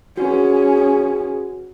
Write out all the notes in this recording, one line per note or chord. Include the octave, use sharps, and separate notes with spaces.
C#4 F#4 G#4 B4